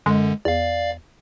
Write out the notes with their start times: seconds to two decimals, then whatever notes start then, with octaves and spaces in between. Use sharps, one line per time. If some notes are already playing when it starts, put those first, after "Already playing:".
0.06 F#2 D3 G#3
0.45 E2 D5 F5